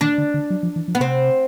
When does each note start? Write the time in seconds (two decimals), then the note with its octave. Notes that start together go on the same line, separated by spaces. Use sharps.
0.01 D#3 D4
0.18 D3
0.34 D3
0.50 F#3
0.63 F3
0.76 E3
0.88 F3
0.95 B3
1.00 C3 C4